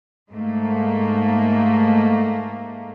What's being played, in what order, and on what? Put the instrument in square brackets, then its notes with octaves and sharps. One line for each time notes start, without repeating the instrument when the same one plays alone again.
[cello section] G#2 A3 A#3